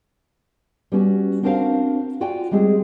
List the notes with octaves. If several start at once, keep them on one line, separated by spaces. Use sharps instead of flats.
G3 B3 C#4 F#4
C4 D4 F#4 A#4 C5 F5
F4 F#4 D5 G5 G#5
G3 G#3 C4 G#4